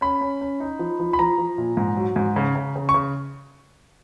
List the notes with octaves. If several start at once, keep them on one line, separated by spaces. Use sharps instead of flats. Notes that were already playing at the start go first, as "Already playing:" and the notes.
C#4 B5
C#4
C#4
D#4
F3
F3
B5
F3 A#5
F3
A#2
G#2
F#3
G#2
C#3
C#3
C#3
C#6
C#3